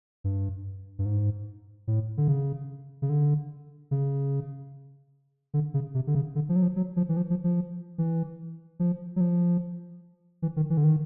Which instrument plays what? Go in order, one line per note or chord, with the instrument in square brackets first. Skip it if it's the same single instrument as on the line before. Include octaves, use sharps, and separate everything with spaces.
[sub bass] G2
G2
G#2
A2
D3
C#3
C#3
D3
C#3
D3
C#3
C3
D3
C#3
D3
F3
F#3
F3
F#3
F3
E3
F3
F3
F3
E3
F3
F#3
F3
E3
D#3
E3
D3
D#3